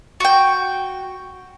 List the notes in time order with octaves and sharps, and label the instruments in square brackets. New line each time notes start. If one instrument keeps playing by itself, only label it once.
[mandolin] F#4 G5